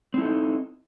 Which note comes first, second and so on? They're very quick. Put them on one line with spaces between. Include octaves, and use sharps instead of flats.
C4 E4 A4 D#4